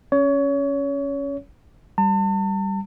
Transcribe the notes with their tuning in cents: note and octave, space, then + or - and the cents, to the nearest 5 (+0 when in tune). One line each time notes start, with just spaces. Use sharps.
C#4 +0 C#5 +25
G3 +0 A5 +40